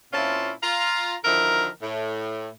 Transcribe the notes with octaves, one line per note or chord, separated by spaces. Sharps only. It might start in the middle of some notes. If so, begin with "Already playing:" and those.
A#2 C4 C#4 E4 F4 A5
F4 F5 A#5
D3 D#3 F3 E4 A4 A#4
A2